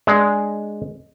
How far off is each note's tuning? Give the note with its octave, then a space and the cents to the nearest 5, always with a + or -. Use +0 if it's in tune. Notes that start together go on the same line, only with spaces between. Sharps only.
G#3 +0 D4 +0